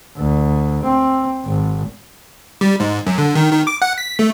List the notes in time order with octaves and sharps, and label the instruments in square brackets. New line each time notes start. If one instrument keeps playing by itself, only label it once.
[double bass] D2
C4
G#1
[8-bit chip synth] G3
G#2
F#2
D3
D#3
D#3
D6
F#5
B6
A3